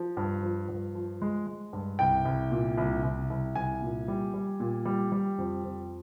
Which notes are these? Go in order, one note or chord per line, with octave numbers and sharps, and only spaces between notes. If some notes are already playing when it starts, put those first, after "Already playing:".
Already playing: F3
G2
F3
G2
F3
G#3
G#3
G2
C2 G5
C2
A#2
C2
C2
C2
C2 G#5
A#2
G3
G3
A#2
G3
G3
F2
F2